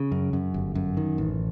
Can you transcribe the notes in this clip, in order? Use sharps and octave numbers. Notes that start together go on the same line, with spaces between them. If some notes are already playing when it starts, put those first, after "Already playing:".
Already playing: C#3
F#2
F#2
G1
F#2
D#3
A1